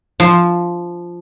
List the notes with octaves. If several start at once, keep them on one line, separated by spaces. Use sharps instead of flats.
F3